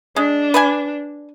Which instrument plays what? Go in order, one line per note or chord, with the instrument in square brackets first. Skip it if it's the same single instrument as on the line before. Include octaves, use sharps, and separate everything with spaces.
[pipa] G#3 [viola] D4
[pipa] B4 D5 G#5